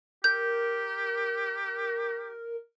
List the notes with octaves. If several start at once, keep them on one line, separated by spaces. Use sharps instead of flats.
G4 A#4 G6